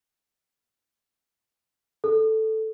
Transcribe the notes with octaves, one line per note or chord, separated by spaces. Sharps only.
A4